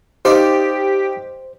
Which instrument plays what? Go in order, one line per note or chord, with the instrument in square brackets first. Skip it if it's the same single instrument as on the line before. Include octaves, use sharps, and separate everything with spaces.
[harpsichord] D#4 D5 F5 [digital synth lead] G4 [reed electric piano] C5